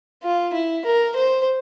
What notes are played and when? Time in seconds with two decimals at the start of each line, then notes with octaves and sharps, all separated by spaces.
0.24 F4
0.54 E4
0.85 A#4
1.16 C5